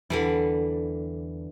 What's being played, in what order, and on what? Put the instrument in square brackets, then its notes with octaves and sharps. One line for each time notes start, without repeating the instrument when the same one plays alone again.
[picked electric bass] E2 [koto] D3 E3 G3